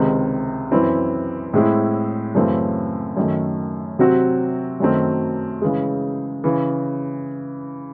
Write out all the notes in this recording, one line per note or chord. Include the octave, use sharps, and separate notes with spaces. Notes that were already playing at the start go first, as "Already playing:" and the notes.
Already playing: C#2 C3 D#3 G#3 C4
F#2 E3 C4 E4
A2 G#3 C4 E4
F#2 C#3 E3 A3 C4
F#2 D#3 A3
C3 F#3 C4 F#4
F#2 D#3 F#3 A3 C4
C#3 E3 G#3
C#3 E3